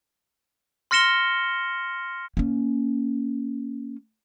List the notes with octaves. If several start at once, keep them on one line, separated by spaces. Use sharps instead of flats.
C6 F6 A#6 C#7 E7 G7
A#3 C#4